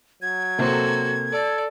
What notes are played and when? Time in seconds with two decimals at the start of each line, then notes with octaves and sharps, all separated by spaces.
0.22 F#3 G#6
0.58 C3 A#3 F#4 A4 C5
1.32 A4 D5